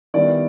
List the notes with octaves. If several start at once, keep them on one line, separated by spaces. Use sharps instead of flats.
D#3 G3 B3 E4 D5